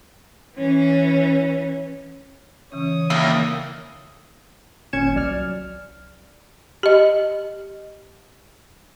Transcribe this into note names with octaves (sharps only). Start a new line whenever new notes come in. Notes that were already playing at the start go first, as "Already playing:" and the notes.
E3 C#4
C#3 E3 C#4 C#5 D#6
D#3 A#3 E4
G#1 A#2 C#4 G#6 C#7 E7
C2 F#3 D5 F6
G4 D#5